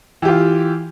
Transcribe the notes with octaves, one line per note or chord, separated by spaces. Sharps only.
E3 F4 G4